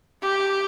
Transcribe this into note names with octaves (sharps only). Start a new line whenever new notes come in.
G4